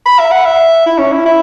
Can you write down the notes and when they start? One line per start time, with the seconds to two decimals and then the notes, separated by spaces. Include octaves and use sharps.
0.06 B5
0.19 E5
0.31 F#5
0.45 E5
0.86 E4
0.98 C#4
1.12 E4
1.25 E4